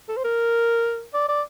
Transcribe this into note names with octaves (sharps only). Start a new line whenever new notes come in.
A4
C5
A#4
D5
D5